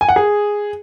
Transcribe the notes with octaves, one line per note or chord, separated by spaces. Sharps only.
G#5
F#5
G#4